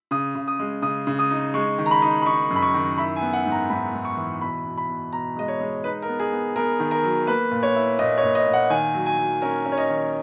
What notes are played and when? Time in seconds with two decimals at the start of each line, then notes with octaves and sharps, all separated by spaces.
0.11 C#3 D#6
0.35 C#3
0.48 D#6
0.59 G#3
0.82 C#3 D#6
1.07 C#3
1.19 D#6
1.31 D#4
1.54 G#3 C#6
1.78 D#3
1.86 A#5
1.91 B5
2.02 D#4
2.22 B5
2.26 D#4 C#6
2.50 F#2
2.56 B5
2.62 C#6
2.74 D#3
2.98 E4 B5
3.16 G#5
3.21 B3
3.33 F#5
3.46 G#2
3.52 A#5
3.70 G#2 B5
3.93 G#2
4.05 C#6
4.17 E3
4.41 B2 B5
4.66 B2
4.77 B5
4.89 B2
5.12 B2 A#5
5.36 G#3 D#5
5.48 C#5
5.61 G#3
5.84 D#4 B4
6.02 A#4
6.08 B3
6.20 G#4
6.32 B3
6.56 B3 A#4
6.80 D#3
6.91 A#4
7.04 F#3
7.27 A#3 B4
7.51 A#2
7.63 C#5
7.75 E4
7.99 A#2 D#5
8.18 C#5
8.24 A#2
8.35 D#5
8.47 A#2
8.53 F#5
8.70 D#3 G#5
8.94 F#3
9.06 G#5
9.18 F#3
9.42 C#4 A#4
9.66 C#4
9.72 C#5
9.78 D#5
9.90 D#3